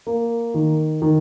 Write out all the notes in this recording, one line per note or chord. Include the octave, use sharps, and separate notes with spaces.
A#3
D#3
D#3